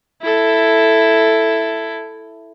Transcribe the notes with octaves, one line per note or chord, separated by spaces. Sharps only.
E4 A4